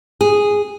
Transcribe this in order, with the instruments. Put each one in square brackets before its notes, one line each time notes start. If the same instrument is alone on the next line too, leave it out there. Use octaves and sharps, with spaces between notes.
[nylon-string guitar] G#4